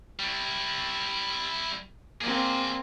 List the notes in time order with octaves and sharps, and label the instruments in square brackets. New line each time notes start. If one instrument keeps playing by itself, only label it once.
[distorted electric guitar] G3 E4
[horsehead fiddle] A#3 C4 [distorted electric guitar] G#4 D5